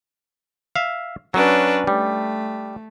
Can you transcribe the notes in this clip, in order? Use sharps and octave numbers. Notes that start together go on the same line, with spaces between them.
E5 F5
F#3 C#4 D4 B4
G3 A3